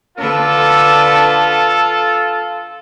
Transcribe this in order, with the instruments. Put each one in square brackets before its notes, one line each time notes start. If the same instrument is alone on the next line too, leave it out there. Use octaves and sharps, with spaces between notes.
[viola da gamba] D3 D4 B4 [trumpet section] F4 A4